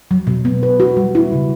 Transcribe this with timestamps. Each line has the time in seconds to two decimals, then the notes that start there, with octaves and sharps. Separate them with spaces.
0.11 F#3
0.27 B2
0.45 B3
0.63 B4
0.80 F#4
0.97 G3
1.15 E4
1.32 C#3